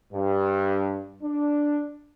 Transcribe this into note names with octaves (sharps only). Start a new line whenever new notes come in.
G2
D4